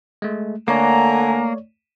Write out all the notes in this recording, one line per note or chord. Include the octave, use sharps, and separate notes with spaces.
G#3 A3
D3 A3 A#3 C#5 D5 G#5 A#5